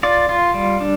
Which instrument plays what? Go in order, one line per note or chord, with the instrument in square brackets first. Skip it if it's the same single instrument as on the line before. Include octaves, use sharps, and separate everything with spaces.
[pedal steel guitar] F4 D5
F4
G3
D4